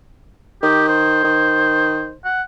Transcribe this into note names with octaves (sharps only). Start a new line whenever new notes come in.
D#3 G4
C5
D#3
F#5